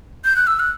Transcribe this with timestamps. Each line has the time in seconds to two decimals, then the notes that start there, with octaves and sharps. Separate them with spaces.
0.25 G6
0.36 F#6
0.47 E6
0.59 F#6